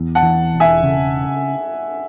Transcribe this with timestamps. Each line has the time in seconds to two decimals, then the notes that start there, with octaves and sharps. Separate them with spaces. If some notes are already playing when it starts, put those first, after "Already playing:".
Already playing: E2
0.15 F#5 A5
0.23 E3
0.53 E1
0.60 E5 G#5
0.83 C#3